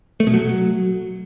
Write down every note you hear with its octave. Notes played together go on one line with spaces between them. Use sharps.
A3
B2
F#3